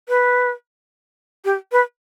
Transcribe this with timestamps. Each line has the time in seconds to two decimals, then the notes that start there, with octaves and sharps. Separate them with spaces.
0.09 B4
1.45 G4
1.72 B4